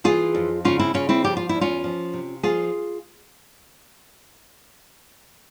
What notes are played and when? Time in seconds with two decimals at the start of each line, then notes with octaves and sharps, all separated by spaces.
0.04 E3 F4 G#4
0.35 F2
0.65 C#3 C#4 F4
0.79 C4 E4
0.94 C#3 C#4 F4
1.09 C4 E4
1.24 F3 G4
1.37 F4
1.49 E4
1.54 E2
1.61 C#4 F4
1.84 F3
2.13 C3
2.43 F3 F4 G#4